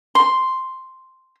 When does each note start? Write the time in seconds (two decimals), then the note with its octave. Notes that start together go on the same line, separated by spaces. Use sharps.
0.15 C6